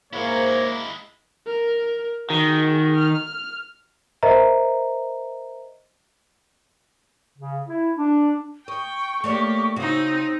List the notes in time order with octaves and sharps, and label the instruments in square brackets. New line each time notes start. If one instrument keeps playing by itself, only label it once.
[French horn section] G#2 G#4 C5 [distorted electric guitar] G#3 E4 [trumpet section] A#3 [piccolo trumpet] C#5
[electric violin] A#4
[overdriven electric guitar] D#3 [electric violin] F#4 G#4
[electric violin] F6
[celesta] A#4 C5 D#5 E5 A#5
[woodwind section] C#3
E4
D4
[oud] D#5 [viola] G5 [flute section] C#6
[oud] A3 D4 C#5 [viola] A#3 G4
[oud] C#3 F#4 [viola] C4 D#4